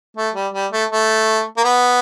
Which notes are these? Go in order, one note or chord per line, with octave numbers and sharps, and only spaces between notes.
A3
G3
G3
A3
A3
A#3
B3